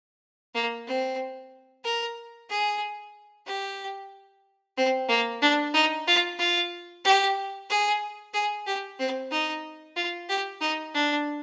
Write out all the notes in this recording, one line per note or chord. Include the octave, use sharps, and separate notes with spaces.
A#3
C4
A#4
G#4
G4
C4
A#3
D4
D#4
F4
F4
G4
G#4
G#4
G4
C4
D#4
F4
G4
D#4
D4